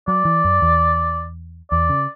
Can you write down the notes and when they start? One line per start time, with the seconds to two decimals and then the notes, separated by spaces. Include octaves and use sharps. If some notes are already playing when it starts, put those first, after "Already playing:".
0.08 F#3 D5
0.25 E3
0.44 F#2
0.62 E2
1.71 E2 D5
1.89 C#3